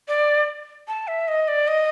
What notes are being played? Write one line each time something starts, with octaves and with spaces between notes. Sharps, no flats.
D5
A5
E5
D#5
D5
D#5